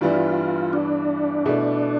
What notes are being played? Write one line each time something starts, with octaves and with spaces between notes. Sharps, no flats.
G2 E3 G3 B3 E4 F4
D4
B2 A3 E4